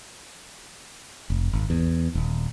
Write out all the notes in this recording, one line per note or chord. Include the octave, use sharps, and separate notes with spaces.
F1
G#1
E2
D#1